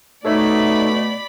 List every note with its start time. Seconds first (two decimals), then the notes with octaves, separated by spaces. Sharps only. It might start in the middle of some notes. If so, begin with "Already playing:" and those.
0.25 B2 A3 D#4 A4 C#5 D5 E5 B5